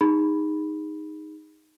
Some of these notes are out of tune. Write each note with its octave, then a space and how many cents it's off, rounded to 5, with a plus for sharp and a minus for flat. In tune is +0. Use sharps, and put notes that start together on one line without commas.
D#4 +0 G#4 -25 B5 +0